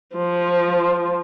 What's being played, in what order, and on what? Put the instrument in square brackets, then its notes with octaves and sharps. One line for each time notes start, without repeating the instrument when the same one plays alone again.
[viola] F3